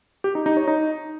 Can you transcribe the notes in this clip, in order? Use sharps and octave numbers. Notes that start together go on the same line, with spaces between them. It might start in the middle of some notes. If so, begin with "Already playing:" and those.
G4
D#4
D#4
C#5
D#4